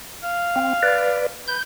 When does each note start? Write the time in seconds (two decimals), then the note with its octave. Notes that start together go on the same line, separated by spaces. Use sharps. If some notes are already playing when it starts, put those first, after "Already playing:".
0.23 F5
0.56 C4
0.83 B4 D5
1.48 B4 G6